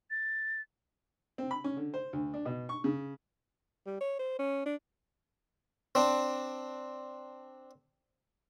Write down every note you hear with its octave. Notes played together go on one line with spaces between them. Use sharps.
A6
C4
B5
C#4
D3
C5
D2
D4
B2
C#6
C#3
G3
C#5
C5
C#4
D4
C4 D4